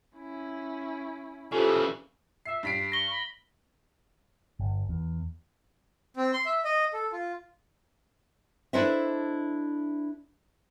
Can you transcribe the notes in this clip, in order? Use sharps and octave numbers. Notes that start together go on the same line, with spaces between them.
C#4 E4
C#3 E3 F4 G4 A4 C5
E5 C7
G2 B6 C7 D7
C#6 A#6 G7
B5
G1
E2
C4
C6
E5
D#5
A4
F4
D4 E4 A4 C5 D#5 E5